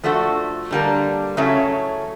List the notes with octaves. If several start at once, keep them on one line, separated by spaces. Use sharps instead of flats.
F3 A3 D4 F#4 A4
D3 G3 A#3 D4
C#3 F#3 A3 C#4 E4